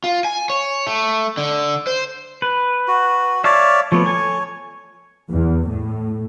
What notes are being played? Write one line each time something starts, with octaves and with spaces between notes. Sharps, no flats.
F4
G#5
C#5
A3
D3
C5
B4
F#4
C#5 D5 E5 F5 A5
F3 A3 B3 C#5
A4 G#5
E2
A2